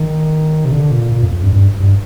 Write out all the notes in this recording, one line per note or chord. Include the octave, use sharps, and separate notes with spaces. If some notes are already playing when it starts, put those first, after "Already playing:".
Already playing: D#3
C3
D3
A#2
A#2
F2
F2
G2
G2
G2